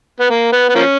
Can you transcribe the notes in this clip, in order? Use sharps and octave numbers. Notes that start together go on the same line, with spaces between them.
B3
A#3
B3
B3
F3 A#3 C#4